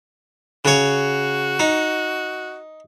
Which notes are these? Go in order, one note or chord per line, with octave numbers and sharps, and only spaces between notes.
C#3 F#4 C#5
D#4